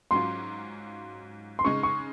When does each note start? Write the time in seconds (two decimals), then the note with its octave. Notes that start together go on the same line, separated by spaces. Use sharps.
0.11 G#2 F#3 C#4 F4 C6
1.59 C6
1.65 C#3 G#3 D#4 C#6
1.83 C#6